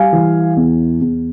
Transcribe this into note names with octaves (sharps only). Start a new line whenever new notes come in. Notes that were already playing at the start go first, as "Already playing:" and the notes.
Already playing: G3 F5 G#5
E3
E2
E2